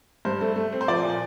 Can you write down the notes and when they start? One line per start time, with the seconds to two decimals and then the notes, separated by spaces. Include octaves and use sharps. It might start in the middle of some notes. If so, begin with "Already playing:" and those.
0.25 G2 C5
0.41 A3
0.56 A3
0.72 C4
0.81 C5
0.88 F3 D5
1.03 A#2